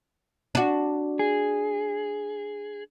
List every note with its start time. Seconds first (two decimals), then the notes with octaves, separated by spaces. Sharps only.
0.55 D4 F#4
1.19 G#4